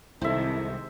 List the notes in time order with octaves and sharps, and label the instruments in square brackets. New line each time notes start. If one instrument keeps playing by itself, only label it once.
[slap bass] C2 [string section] C3 D#3 G#3 [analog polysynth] E4 A4 [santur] C5 E5